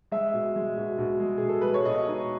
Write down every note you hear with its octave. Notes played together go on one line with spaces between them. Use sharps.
G#3 E5
B2
G#3
B2
B2
G#3
B2 G#4
A4
G#3 B4
C#5
B2 D#5
D#4